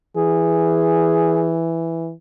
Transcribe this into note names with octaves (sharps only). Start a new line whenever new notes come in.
E3 G#4